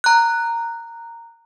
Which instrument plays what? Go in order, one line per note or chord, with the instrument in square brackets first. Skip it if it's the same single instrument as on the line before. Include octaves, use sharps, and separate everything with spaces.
[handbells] A#5 F#6